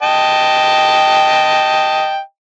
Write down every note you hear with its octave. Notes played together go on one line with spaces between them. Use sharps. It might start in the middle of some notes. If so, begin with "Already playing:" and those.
D#5 G5 A5